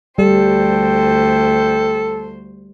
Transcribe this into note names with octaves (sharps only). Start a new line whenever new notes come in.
D2 G3 A4 C5 G5